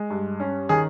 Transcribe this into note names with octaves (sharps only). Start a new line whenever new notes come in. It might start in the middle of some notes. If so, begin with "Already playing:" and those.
Already playing: G#3
G2
C#4
D#3 G#4